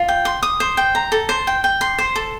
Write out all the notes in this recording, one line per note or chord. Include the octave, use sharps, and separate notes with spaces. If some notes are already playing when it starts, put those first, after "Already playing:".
Already playing: F4
G5
C6
D#6
C5
G5
A#5
A4
C5
G5
G5
C6
C5
A4